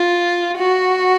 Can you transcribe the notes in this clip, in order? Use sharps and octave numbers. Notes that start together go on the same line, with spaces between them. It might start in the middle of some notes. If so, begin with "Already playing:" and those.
Already playing: F4
F#4